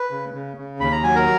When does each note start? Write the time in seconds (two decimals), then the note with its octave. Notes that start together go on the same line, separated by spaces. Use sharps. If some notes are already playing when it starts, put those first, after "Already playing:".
Already playing: B4
0.11 C#3
0.34 C#3
0.57 C#3
0.80 D#2 B5
0.92 A#5
1.03 F#3 G#5
1.15 A#4 A#5